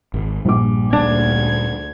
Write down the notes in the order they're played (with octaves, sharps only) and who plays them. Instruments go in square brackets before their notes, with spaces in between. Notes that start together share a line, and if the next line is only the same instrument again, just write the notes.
[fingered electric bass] G#1
[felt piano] A#1 D6 [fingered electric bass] G2 G3
[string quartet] D2 G#6 [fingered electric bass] A#2 G3 A#3 [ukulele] D4